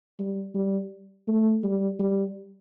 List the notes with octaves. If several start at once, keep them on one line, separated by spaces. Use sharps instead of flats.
G3
G3
A3
G3
G3